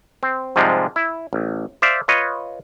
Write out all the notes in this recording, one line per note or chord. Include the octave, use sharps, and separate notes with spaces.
C4
G#2 C3 F3 G3 G#3
E4
A1
C5 D5 E5 F5
F4 B4 C#5 D#5